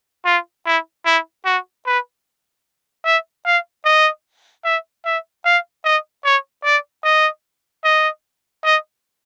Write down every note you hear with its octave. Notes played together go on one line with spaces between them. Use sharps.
F4
E4
E4
F#4
B4
E5
F5
D#5
E5
E5
F5
D#5
C#5
D5
D#5
D#5
D#5